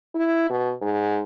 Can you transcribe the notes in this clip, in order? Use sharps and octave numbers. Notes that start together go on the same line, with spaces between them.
E4
B2
G#2